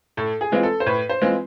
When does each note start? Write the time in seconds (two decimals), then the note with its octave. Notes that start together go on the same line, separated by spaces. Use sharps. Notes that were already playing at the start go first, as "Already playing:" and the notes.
0.17 A2 A4
0.41 G#4
0.52 E3 G#3 C4 F4
0.63 A4
0.80 C5
0.86 A2 B4
1.09 C5
1.22 E3 G#3 C4 F4